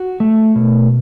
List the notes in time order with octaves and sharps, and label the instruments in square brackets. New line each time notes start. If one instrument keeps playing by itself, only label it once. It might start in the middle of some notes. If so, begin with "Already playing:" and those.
Already playing: [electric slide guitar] F#4
A3
B2